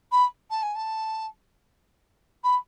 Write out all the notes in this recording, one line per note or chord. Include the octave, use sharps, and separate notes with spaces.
B5
A5
G#5
A5
B5